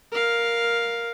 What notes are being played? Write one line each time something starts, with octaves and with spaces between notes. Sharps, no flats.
A#4 F5